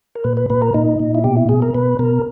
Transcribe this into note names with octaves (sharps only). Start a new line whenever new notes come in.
A#4
A#2 B4
B4
A#2 B4
A#4
A#2 D#4
A#2
E4
B2 G4
E4
B2 G#4
A#4
B2 B4
B2 A#4